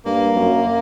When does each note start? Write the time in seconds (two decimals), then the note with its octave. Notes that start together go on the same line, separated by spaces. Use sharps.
0.06 G2 A#3
0.36 F#2